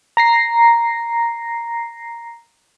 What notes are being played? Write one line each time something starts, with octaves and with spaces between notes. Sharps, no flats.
A#5 A#6 C7